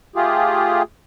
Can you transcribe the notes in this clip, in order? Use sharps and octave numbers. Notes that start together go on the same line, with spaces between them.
A3 F4 G4 G#4